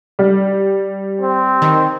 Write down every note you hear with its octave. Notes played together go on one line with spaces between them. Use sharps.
G3
C4
D#3